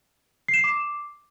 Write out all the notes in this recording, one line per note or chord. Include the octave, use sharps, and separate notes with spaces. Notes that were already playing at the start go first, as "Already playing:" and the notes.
C7
E7
C7
D6